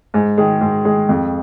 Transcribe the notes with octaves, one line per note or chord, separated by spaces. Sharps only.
G#2
D#3 G#3
G#2
D#3 G#3
F2